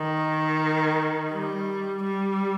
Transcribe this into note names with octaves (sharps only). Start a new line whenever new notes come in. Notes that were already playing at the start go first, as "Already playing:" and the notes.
Already playing: D#3
G3
G3